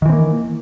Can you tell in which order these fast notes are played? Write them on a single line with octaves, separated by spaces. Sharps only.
D#3 E3 C4 A#3